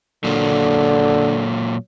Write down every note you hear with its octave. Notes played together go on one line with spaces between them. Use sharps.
A#2 D3 F#3 A#3